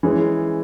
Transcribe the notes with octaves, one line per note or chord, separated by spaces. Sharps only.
E3 G#3 C#4